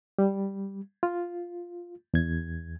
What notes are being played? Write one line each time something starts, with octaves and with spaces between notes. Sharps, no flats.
G3
F4
E2 G#6